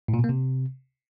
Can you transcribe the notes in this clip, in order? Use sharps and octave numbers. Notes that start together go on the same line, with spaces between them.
A2
A#2
B2
A#3
C3